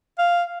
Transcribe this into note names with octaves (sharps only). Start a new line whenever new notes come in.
F5